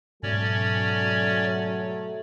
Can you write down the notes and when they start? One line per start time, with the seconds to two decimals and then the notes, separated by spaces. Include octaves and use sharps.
0.23 G#2 B2 F#3 A3 C#4 C#5 D5